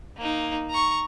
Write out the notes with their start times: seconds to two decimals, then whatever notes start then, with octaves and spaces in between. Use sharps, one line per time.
0.17 A#3 D#4
0.70 A#5 C#6